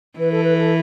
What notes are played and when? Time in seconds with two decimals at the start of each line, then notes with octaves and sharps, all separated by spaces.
0.19 E3 B4
0.32 A4
0.44 B4
0.57 A4